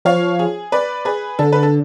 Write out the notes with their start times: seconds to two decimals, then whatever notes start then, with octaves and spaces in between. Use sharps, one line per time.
0.05 F3 C#5 F5
0.39 G#4
0.72 B4 D5
1.05 G#4 B4
1.39 D3 A4
1.52 B4
1.63 A4